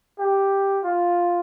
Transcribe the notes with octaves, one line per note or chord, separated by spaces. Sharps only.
G4
F4